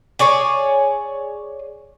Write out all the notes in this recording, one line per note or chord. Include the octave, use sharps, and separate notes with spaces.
G#4 C#5 D5 G#5